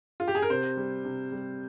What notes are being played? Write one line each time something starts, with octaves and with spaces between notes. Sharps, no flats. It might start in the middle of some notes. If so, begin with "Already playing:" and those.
F4
G4
G#4
A#4
C3 C5
G3
C3
G3